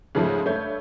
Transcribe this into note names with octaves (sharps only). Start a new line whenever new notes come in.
G#2 C#3 F3 G#3 A3
G2 A3 C#5 G6